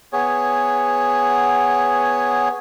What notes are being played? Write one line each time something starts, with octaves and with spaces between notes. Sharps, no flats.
B3 G#4 C#5